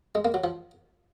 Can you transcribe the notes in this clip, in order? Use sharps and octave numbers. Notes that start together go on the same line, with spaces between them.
G#3
A#3
F#3
F3